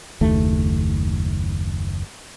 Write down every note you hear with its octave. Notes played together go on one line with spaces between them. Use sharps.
F#1 D#2 A3